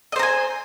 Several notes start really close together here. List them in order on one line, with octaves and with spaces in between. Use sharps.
D#5 C5 A#5 G#5